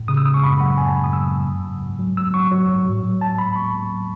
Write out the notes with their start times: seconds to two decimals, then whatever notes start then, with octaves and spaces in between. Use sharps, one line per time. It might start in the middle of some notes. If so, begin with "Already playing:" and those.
Already playing: A2
0.08 C#3 D#6
0.17 E6
0.25 C#3 D#6
0.34 C#6
0.43 F#2 B5
0.60 F#3 F#5
0.78 F#2 G#5
0.87 A5
0.96 F#2 B5
1.04 D#6
1.13 F#3 E6
1.30 F#3
1.47 G#2
1.65 G#2
1.82 G#2
1.99 F#3
2.17 F#3 E6
2.34 F#3 C#6
2.51 F#3
2.69 G#2
2.86 A2
3.03 F#3
3.21 F#3 A5
3.38 F#3 B5
3.55 F#3 C#6
3.73 F#3
3.91 F#3